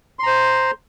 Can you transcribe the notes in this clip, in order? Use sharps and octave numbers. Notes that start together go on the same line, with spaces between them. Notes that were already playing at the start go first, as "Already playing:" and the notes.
C5 A#5 C6